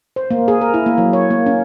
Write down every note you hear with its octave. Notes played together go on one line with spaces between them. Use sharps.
C5
A#3
G#4
A#4
E4
A#3
F#3
C#5
A#3
C#4